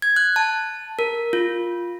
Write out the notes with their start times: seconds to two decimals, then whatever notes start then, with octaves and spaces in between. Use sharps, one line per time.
0.02 G#6
0.16 F#6
0.36 A5
0.99 A#4
1.33 F4